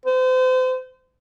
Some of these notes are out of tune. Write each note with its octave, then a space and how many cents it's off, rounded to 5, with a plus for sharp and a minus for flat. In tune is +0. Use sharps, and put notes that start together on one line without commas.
C5 -35